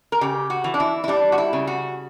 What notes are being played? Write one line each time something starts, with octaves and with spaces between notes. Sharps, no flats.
A#4
C#3 G4
F#4
E3
D4
E4
E4
G3 D4
F#4
E4
C#3
F#4